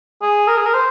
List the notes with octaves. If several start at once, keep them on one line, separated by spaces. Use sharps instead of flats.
G#4
A#4
G#4
A#4
C5